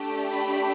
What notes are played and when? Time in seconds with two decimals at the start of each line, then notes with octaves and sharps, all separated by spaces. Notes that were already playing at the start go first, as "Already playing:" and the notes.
Already playing: A3 D4 G4
0.32 B5